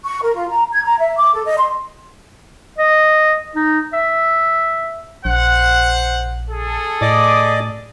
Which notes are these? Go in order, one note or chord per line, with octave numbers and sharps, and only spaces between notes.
C#6
A#4
F4
A#5
G#6
A#5
E5
D6
A4
D#5
C6
D#5
D#4
E5
A#1 C5 F#5
G#4 A4
A2 D5 D#5 D6